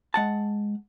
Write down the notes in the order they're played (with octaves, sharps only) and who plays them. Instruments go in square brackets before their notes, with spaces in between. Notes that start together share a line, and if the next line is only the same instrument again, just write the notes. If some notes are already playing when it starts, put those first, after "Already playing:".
[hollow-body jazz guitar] G#3 F#5 A5